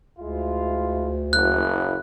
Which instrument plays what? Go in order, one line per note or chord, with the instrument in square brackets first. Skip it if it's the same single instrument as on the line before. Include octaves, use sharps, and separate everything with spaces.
[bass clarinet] D2 [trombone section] G#3 E4 F4
[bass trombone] F#1 [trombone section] F#3 A#3 E4 [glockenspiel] F#6